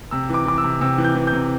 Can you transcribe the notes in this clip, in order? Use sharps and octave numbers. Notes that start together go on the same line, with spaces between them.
C3 E6
E3 D6
E3 D6
E6
C3
C3 E6
E3
G6
E3
G6
C3